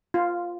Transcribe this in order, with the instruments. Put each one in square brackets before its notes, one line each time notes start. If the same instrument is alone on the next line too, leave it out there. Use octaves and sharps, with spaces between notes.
[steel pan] F4